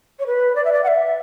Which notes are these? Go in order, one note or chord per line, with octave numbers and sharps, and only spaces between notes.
C#5
B4
D5
E5
D5
F#5
E5